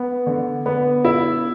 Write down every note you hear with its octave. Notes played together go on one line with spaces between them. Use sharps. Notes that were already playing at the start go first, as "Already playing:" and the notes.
Already playing: B3
D3
B3
E4